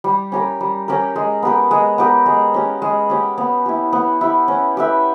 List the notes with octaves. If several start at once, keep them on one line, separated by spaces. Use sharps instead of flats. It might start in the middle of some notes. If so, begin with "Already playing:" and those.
G3
C#4 G4 A#4
G3
C#4 G4 A#4
G#3
B3 G4 A#4
G#3
B3 G4 A#4
G#3
C#4 G4
G#3
C#4 G4
B3
E4 G4
B3
E4 G4
C#4
G4 B4 E5